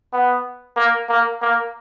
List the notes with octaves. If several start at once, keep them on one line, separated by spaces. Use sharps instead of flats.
B3
A#3
A#3
A#3